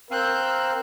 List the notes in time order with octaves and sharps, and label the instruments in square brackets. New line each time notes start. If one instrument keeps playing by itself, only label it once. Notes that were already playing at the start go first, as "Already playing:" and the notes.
[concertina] C4 F5 [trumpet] A#4 [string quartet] E6 F#6 G6